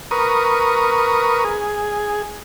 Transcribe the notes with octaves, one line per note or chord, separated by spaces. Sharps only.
A#4 B4 C#6 D#6
G#4